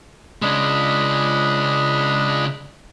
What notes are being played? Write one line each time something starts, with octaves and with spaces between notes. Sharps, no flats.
C#3 G#3 D4 D#5 B5